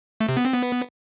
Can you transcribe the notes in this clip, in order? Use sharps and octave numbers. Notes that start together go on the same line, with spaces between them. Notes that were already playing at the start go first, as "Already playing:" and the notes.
A3
C3
B3
C4
B3